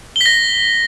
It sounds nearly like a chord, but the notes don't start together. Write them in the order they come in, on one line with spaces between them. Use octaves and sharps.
G7 B6 A#6